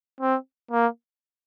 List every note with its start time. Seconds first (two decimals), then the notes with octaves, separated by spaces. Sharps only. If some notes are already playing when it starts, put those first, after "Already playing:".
0.21 C4
0.71 A#3